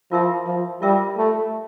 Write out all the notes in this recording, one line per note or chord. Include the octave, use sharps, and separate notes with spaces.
F3 F4 A#4 E5
F3
G3 F4 A#4 E5
A3